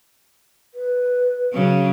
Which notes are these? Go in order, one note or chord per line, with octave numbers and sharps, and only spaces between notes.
B4
C#3 F#3